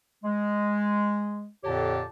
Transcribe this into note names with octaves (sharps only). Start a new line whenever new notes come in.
G#3
F2 A#2 D3 G4 C#5 A5